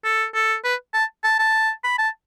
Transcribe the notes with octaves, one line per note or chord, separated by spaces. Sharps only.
A4
A4
B4
A5
A5
A5
B5
A5